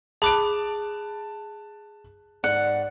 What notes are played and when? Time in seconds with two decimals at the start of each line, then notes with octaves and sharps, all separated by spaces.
0.22 G#4 A5 B5 D6 F#6 D7
2.44 G#2 D5 F#5